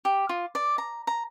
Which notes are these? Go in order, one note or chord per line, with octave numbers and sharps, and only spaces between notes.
G4
F4
D5
A#5
A#5